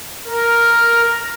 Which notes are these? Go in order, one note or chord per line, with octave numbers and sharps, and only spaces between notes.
A#4